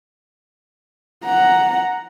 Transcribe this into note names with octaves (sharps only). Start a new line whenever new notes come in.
F#5 A#5